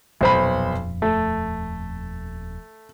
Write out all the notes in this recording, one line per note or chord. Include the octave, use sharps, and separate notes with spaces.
D#1 B1 F2 C5 B5
A3